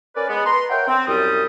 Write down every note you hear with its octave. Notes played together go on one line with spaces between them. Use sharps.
C#4 A#4 B4 D5
G#3 B3
B4 A#5 C6
A#4 C#5 E5 F#5 G5
C4
C2 F#2 G3 D#6